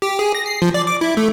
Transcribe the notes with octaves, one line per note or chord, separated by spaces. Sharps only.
G4
G#4
A#6
C7
F3
D5
D6
E4
A3